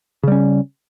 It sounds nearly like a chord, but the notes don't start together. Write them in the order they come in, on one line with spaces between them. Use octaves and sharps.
C#3 G3 C#4